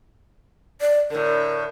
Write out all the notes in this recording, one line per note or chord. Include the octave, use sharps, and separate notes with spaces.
D5
A2 D3 A#4